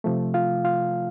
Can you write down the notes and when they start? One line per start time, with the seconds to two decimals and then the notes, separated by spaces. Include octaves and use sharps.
0.04 C3 F3 A3
0.34 F4 F5
0.65 F4 F5